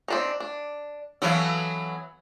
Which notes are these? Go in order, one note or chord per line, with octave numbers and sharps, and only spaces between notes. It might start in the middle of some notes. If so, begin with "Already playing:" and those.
C4 D4 D#4
D4
E3 F#3 B3 A4 F5